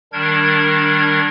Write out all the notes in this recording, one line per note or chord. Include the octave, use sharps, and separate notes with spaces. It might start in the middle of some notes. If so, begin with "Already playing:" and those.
D#3 G3 D4 A#4 G#6